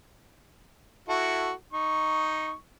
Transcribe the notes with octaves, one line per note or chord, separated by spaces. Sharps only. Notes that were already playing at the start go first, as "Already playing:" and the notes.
E4 F#4 A4
D#4 C#6